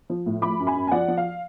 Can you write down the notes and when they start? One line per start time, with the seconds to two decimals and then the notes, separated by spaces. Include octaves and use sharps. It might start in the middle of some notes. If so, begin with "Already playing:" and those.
0.10 F3
0.26 A2
0.42 F3 B5 D6
0.60 F#2
0.67 G#5 B5
0.76 F#2
0.87 G#5
0.91 F3 D5 F#5
1.08 F3
1.17 F5